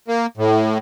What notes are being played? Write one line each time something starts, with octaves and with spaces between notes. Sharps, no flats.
A#3
A2